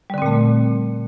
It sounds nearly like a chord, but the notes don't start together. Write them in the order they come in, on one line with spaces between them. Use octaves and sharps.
G3 D3 C4 A#2 A3